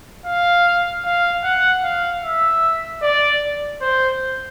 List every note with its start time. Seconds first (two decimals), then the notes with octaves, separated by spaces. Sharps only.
0.26 F5
1.04 F5
1.44 F#5
1.83 F5
2.24 E5
3.02 D5
3.81 C5